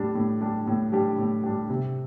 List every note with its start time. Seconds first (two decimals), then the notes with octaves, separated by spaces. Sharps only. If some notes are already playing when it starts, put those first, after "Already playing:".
Already playing: A2 G3 D4 G4
0.15 A2
0.41 G3 D4 G4
0.67 A2
0.92 G3 D4 G4
1.18 A2
1.44 G3 D4 G4
1.70 C3